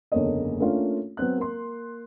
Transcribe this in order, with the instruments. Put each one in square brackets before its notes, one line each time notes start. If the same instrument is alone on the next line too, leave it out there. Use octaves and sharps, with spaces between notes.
[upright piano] F#1 E2 D3 A#3 C#5 D#5
A3 A#3 C#4 D4 F4
F#3 B3 C4 F#6
A#3 C6